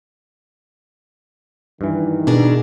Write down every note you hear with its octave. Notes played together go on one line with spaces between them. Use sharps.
G2 D#3 E3
B2 D4 G#4 A#4